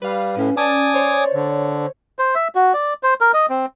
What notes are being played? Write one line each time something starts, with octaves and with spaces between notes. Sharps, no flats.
G3 B4 F5
A2 C#4
C#4 D5 G#5 A5 D6 D#6
C5 C#5
D3
C5
E5
F#4
D5
C5
A#4
D#5
C4